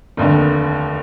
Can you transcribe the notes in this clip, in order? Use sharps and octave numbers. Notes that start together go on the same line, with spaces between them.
F1 D#2 D3